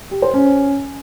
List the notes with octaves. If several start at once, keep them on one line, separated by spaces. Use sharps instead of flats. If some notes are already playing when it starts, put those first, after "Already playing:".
G4
C5
C#4